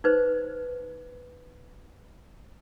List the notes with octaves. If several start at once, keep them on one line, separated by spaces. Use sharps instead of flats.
D#4 B4 C5